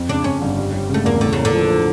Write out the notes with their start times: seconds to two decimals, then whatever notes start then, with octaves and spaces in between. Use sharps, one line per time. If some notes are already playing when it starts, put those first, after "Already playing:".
Already playing: F2
0.09 C#3 D4
0.24 F2 C#4
0.42 G1
0.57 G3
0.73 G3
0.90 C#3 A3
1.05 E2 A#3
1.21 A2 D3
1.33 C#3 A#3
1.45 D3
1.54 F3
1.70 F3